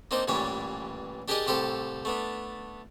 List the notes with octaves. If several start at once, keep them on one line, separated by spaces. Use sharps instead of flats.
A#3 C4 D4 D#4 C5
A1 A#2 E3 G3 C#5 D5
D4 G4 G#4 A#4 D5 D#5
C2 A2 G4 A4 C5 F5
A3 B3 D4